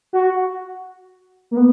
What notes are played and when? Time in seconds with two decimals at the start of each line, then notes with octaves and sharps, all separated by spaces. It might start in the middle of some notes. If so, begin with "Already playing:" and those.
0.13 F#4
1.51 A#3
1.57 B3